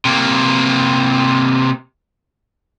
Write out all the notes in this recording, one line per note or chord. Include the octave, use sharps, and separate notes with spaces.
C3 A#3